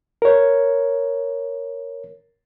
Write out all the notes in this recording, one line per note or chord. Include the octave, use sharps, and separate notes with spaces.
A#4 C#5